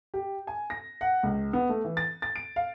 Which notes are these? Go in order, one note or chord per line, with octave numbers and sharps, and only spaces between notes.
G4
G#5
A#6
F#5
C#2
B3
A3
E3
A6
A6
D7
F5